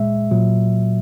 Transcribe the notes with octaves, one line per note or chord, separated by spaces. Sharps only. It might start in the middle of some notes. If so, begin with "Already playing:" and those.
Already playing: A#2 G#3 E5
A#2 F#3